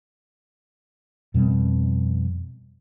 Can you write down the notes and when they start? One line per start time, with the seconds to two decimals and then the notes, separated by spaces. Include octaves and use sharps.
1.34 F2 B2 G3 C4